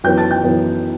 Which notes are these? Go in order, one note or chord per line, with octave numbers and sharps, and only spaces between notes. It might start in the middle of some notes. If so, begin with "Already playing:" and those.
F#2 E3 B3 G5 G6
A5 A6
G5 G6
F#2 E3 B3